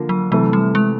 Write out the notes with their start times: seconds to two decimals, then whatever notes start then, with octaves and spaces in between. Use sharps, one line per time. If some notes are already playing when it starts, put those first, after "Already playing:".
Already playing: D3 F3 A#3
0.09 F#3
0.31 C3 E3 F#3 A3
0.53 G3
0.75 G#3